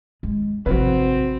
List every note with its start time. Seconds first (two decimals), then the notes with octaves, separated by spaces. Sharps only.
0.23 G#3
0.66 G#1 C3 F3 C4 F#4 B4